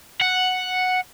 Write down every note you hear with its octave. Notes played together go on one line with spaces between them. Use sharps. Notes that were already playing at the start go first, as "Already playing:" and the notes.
F#5